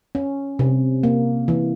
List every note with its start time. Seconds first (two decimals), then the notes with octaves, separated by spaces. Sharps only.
0.15 C#4
0.59 C3
1.03 A#3
1.48 E3